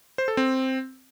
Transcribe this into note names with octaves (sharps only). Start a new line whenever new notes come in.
C5
A4
C4